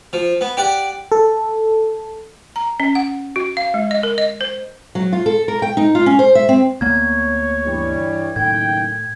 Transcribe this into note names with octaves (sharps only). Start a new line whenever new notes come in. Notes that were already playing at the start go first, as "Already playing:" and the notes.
F3
B3
G4 D5 F#5
A4
A#5
C#4
F#5
F#4
F5
G#3
D#5
A#4
D#5
C5
F#3
F4
A4
A#4
G5
D#4
F4
C#4
C5
E5
C4
D2 A#3 B3 C#5 G#6
G2 E3 G3
F#1 A2 D#3 G5 G#6